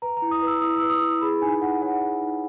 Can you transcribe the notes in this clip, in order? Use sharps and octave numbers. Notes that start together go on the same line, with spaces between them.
B4 A#5
A#5
E4
D#6
B4
E6
E4 D#6
E6
B4
D#6
E4
G#4 B5
D#4 G#5
D#4 F#5
C#5 F#5
G#4
D#4